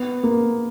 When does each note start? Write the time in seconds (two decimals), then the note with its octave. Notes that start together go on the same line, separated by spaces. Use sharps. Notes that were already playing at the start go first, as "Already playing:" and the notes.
Already playing: B3
0.23 A#3